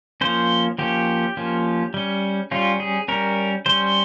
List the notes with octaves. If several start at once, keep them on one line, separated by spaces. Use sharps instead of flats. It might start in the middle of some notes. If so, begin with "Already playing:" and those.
F3 A#3 C#4 C5
F3 A#3 C#4 G4
F3 A#3 C#4
G3 C#4
G3 C#4 F4
G#4
G3 C#4 A#4
G3 C#4 C5